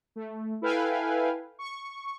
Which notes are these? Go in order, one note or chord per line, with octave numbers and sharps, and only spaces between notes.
A3
E4 A4 B4 F5 G5 G#5
C#6